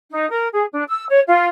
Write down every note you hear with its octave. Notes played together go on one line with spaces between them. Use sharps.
D#4
A#4
G#4
D4
E6
C#5
F4